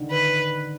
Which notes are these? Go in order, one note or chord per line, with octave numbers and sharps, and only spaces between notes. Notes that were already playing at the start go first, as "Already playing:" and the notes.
Already playing: D3 D#3
B4